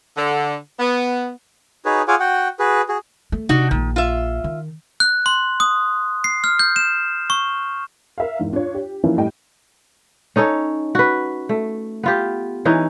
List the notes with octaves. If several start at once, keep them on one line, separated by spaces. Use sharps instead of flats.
D3
B3
D#4 F#4 G#4 B4 C#5
F4 G#4 C#5 F#5 G#5 D6
F#4 F#5 G5
F#4 G#4 B4
F#4 G#4
A3
C3 D4 D#4 F#4
A#1 D#3 A#3
F4 E5
D#3
F#6
C6
D#6
C7
F6
G6
E7
C#6
A#4 E5 F5
E2 G#2
D4 F4 C#5
G4
E3 F3 A#3 C#4 D#4 E4
A2 G3 A3 D#5 G5
C#4 D#4 A4 C#5
F#4 B4
A3
B3 F4 G4
E3 C#4 D#4